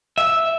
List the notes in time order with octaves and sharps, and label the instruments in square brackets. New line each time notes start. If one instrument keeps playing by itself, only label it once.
[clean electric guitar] E5